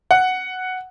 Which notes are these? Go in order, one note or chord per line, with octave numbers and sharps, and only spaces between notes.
F#5